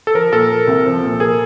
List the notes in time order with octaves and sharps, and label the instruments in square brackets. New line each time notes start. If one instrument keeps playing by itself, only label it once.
[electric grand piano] A4
[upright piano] F3 [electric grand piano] A#4
[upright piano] A#2 [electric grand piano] A4
[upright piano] A#3
C2
F3
A#2
[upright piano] A#3 [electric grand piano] G#4